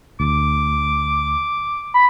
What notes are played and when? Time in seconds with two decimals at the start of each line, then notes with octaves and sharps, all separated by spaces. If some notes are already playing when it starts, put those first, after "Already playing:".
0.20 D2 D6
1.94 B5